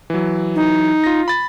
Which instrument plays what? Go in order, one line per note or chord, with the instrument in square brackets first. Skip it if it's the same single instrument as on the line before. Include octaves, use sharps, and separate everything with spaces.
[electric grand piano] E3 F#3
[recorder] D#4
[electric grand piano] F4 A#6
B5 A6